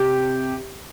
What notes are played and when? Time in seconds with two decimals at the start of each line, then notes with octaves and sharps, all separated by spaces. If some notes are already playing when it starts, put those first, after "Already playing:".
Already playing: C3 G4